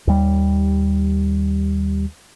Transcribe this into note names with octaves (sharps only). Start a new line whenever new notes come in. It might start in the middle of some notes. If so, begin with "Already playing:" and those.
D#2 G3